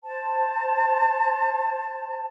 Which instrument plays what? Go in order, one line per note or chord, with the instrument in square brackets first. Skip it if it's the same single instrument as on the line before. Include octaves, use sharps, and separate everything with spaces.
[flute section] C5 A5